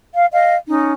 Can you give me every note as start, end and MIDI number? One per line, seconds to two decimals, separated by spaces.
0.14 0.27 77
0.31 0.55 75
0.31 0.55 77
0.67 0.93 61
0.67 0.93 63